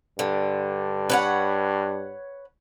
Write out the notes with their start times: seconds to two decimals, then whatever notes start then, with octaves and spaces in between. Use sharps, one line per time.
0.19 G2 D3
1.10 B4 C#5 F#5